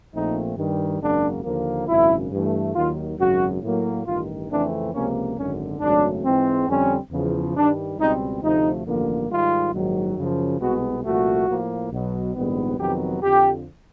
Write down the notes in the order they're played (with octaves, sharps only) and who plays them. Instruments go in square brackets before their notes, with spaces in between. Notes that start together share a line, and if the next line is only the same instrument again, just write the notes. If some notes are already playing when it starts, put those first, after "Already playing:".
[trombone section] A#1 A#2 F3 A3 C4 D#4
G2 D#3 G3
G#1 F#2 C#3 F#3 A#3 D4
D#2 D3 F3 A#3
G#1 F#2 C#3 E4
G2 E3 A3
D#2 D#3 F#3 F4
G#1 F#2 C#3 F#3 F#4
A2 F#3 A#3
A1 G2 D#3 F4
F2 C#3 E3 A3 C4 D4
C#2 C3 F3 A#3 C#4
G#1 F#2 D3 C#4
G#1 F#2 C#3 F#3 A3 D4
G#2 E3 G#3 C4
F2 D3 G3 C4 C#4
E2 C#3 F3
G2 D#3 G3 D4
C#2 B2 G3 C4 D#4
D2 C3 F3 A3 D#4
A1 G2 D3 F3 A#3
G#2 D#3 G3 F4
A#1 G#2 D#3 F#3
F#2 C#3 F3
C2 B2 G#3 B3 F#4
C2 A#2 F3 A3 F#4
A2 F3 A#3
B1 B2 F#3
A#1 G#2 D#3 G3 B3
F2 C3 D#3 F#3 B3 G4
F2 D3 F3 G4